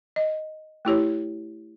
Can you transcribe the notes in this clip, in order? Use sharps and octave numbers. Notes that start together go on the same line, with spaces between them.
D#5
A3 E4 G4 C#5